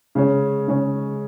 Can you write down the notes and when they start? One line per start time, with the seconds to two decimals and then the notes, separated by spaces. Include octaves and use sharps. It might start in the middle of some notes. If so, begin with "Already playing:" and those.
0.15 C#3 G#3 C#4
0.68 C#3 G#3 C#4